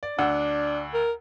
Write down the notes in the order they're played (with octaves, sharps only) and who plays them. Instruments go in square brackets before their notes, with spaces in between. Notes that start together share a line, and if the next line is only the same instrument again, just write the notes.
[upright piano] D5
[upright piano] D2 F#5 E6 [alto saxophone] D4
[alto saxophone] A#4